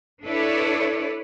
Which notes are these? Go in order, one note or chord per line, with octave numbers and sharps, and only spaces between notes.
D4 E4 A4 B4 C#5 D5